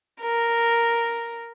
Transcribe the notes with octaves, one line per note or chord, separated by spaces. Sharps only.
A#4